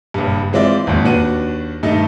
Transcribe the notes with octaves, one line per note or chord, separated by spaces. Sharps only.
F#1 G2
E3 G#3 C4 F4 D5 E5
G#1 F2 A#2
D#2 D4 F#4 B4 D#7
G2 D#3 A3 D#4